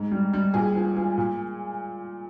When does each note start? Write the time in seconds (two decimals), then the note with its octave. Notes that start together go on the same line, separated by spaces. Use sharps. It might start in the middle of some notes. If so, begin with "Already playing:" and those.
Already playing: G#2
0.12 G3
0.33 G3
0.54 A#2 G#4
0.76 F3
0.97 F3
1.18 A#2